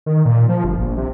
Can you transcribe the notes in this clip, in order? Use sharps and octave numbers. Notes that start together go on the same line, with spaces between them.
D#3
A#2
F3
G1
A#1
C3